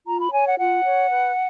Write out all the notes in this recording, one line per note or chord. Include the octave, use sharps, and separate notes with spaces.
F4 A#5
B5
C#5 G#5
F#5
F4 F#5
C#5
B4